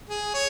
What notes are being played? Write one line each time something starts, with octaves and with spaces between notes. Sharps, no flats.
G#4
C#5